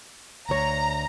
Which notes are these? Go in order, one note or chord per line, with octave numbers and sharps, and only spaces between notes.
D2 C#5 A#5